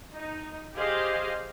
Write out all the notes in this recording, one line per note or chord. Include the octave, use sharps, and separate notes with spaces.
D#4
G4 G#4 C5 D#5 F5